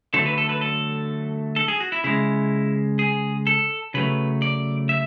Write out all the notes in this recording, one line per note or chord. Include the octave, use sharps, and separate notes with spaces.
D3 F#3 A3 A4
B4
A4
B4
A4
A4
G#4
F#4
E4
C#3 G#3 E4
G#4
A4
C#3 F#3 A3 B4
D5
E5